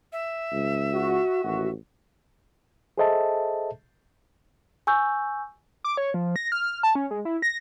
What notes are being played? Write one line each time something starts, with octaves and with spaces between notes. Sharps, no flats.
E5
C#2
F#4
A1 D#2 F#4
G#4 A4 C5 D#5 E5 A5
G#5 C#6 E6 G6
D6
C#5
F3
A#6
F6
A5
C#4
G#3
E4
A#6